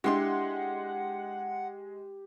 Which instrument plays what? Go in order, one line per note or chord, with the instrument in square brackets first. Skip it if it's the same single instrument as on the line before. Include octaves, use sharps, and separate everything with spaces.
[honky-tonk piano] G#3 C6 [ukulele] D4 E4 F#4 [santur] G4 [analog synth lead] F#5